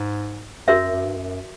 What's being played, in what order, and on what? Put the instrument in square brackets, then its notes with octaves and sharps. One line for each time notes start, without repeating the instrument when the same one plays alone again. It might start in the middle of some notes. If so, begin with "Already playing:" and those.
Already playing: [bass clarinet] G#2
[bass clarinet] F#2 [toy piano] F#4 A#4 C#5 E5
[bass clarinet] F#2
G2
F#2